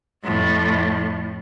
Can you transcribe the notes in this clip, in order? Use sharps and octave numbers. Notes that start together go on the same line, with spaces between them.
F2 A2